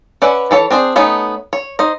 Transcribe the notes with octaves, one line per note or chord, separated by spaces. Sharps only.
C#4 B4 D5 E5 F#5
E3 A4 C#5 A5
C4 D4 G#4 C5
A3 B3 C#4 D#4
C#5
D#4 C5 D#5